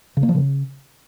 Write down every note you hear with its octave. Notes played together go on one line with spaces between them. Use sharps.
C#3
A#3
F3
C#3